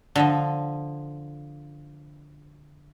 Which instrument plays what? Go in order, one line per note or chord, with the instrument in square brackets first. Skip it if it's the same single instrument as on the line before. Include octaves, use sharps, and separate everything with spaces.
[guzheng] D3 F3 D#5